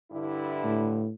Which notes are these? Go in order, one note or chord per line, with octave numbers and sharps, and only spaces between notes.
G2 D3 E4
A2